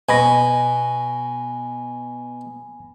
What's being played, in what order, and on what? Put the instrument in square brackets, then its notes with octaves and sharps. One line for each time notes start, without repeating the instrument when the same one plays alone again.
[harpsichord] B2 [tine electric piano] G#5 B5 A#6